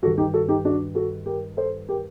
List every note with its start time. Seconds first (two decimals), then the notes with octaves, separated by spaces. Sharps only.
0.02 G2 F#4 A4
0.06 D#3
0.18 D#4 G4
0.34 F#4 A4
0.49 D#4 G4
0.65 D4 F#4
0.95 F#4 A4
1.26 G4 A#4
1.57 A4 C5
1.88 G4 A#4